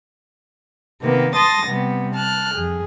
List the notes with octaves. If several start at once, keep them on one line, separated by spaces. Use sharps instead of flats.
C3 D#3 A#3 B3
A5 C6 D#6 A6 A#6
C3 G3 B3
A5 F6 F#6
F2 G#4